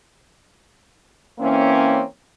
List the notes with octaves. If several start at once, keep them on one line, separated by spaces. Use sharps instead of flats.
E3 A#3 C4 C#4